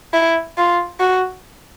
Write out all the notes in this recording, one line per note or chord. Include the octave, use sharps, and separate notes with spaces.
E4
F4
F#4